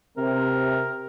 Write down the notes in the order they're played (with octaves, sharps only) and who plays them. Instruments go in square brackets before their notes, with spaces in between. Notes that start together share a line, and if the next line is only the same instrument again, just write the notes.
[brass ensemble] C3 [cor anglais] A#4